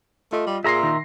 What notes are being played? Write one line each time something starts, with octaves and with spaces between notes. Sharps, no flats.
A3 F4 D#5
G3
A#2 G#4 E5 A#5 C6 A#6 C7
D#3